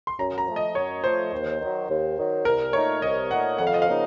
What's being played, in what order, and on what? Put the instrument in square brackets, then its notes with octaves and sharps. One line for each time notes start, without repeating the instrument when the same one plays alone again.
[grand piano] C6
[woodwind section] F#2 [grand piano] A#5
[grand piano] A#5
[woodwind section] F3 A3
[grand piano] D#5
[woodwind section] F#2 [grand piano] C#5
[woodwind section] F3 A3 [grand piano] C5
[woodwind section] D#2
D#3 F#3
D#2
D#3 F#3
[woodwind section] C2 [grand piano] A#4
[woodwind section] A#2 A3 D#4 [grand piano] C#5
[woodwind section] C2 [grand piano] D#5
[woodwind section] A#2 A3 D#4 [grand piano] F#5
[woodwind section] F2 [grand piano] F#5
[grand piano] F5
D#5
F5
[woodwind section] C#3 F3 A#3 D#4